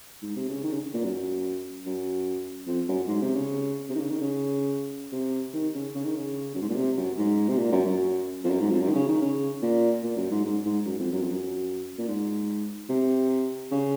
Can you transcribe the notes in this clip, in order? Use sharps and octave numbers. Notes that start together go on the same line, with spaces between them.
G#2
C3
C#3
D#3
C#3
A#2
F#2
F#2
F2
F#2
G#2
C3
C#3
C3
D#3
C#3
D#3
C#3
C3
D#3
C#3
C#3
D#3
C#3
F#2
G#2
A#2
C3
F#2
G#2
C3
A#2
F#2
F#2
F2
F#2
G#2
F2
F#2
D#3
C#3
D#3
C#3
A#2
A#2
F#2
G#2
G#2
G#2
F#2
F2
F#2
F2
F#2
A#2
G#2
C3
C#3